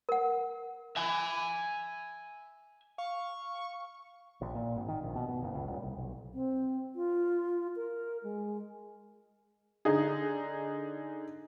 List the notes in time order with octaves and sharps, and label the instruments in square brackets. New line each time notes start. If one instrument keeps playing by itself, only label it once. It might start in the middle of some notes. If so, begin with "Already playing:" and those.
[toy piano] A#4 F#5
[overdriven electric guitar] E5 G#5
[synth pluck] F5 [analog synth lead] C#6
[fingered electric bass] A#1
A#2
G#1
D#3
A#1
B2
B2
F#1
C#2
D#1
C2
B1
[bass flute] C4
F4
A#4
G#3
[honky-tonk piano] D3 D#4 G#4